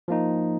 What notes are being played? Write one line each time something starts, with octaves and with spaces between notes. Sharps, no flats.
F3 A#3 D#4